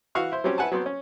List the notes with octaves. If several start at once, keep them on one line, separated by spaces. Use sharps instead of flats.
E3 F#4 F5 C#6 F6
E4 C5
F#3 G3 C4 C#4 G4
E4 B4 F#5 G#5 A5
F#3 B3 C4 C5
C#4